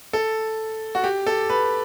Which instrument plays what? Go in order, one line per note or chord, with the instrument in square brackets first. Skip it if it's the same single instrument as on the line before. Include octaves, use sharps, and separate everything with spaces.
[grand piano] A4
F#4
G4
A4
B4